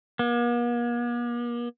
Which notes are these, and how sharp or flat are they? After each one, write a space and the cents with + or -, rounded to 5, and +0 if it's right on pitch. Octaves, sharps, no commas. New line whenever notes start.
A#3 +45